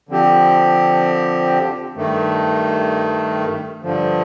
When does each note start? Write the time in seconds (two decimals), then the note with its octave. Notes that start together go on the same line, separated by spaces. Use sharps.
0.09 D3 F3 C4 G4
1.96 G2 D#3 A3
3.83 G2 D3 F3